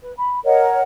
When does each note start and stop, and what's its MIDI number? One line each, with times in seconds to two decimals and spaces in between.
0.01 0.13 71
0.16 0.40 83
0.44 0.81 70
0.44 0.81 73
0.44 0.81 75
0.44 0.81 78